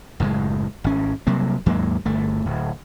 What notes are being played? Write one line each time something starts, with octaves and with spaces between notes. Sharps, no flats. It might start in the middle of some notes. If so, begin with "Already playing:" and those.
F#1 A2 D#3 G#3
G#1 C#4
C3 F#3 G3 A#3
D#2 G#2 F#3 A#3
G1 A3
D1